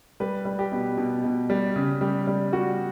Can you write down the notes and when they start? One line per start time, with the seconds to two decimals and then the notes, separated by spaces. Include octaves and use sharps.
0.20 G3 B4
0.45 G3
0.59 G4
0.72 B2
0.98 B2
1.24 B2
1.50 G3
1.76 C#3
2.01 G3
2.27 G3
2.52 G3 F#4